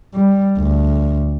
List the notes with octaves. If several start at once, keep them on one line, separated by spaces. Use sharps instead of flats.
G3
D2